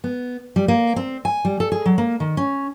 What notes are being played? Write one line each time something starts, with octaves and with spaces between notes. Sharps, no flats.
B3
G3
A#3
C4
G#5
G3
A4
G#4
F#3
A#3
D#3
C#4